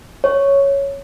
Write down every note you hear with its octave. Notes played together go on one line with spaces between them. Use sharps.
C#5